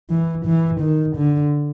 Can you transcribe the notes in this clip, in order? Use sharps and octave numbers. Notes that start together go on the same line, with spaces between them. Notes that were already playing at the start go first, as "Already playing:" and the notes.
E3
E3
D#3
D3